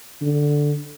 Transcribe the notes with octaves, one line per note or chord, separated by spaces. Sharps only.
D3